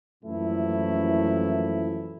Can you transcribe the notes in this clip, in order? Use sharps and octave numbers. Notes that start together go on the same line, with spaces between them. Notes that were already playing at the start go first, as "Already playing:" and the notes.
F#2 A#2 E3 F3 A3 E4